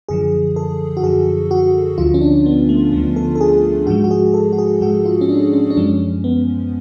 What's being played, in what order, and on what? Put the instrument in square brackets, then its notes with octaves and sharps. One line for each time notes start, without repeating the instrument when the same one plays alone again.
[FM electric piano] F#2 D3 F3 G#4
A4
F#4
F#2 D3 F3 G#4
F#4
D2 D3 F3 F4
C#4
D4
B3
A3
D2 D3 F3 B3
A4
A4
G#4
G#2 F3 G#3 F#4
F#4
G#4
A4
F#4
G#4
G#2 F3 G#3 F#4
F4
C#4
D4
C#4
D4
F#2 F3 G#3 C#4
B3